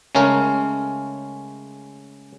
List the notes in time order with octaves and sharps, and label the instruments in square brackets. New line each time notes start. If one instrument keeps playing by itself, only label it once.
[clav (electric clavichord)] C#3 G#3 A3 C#4 A#4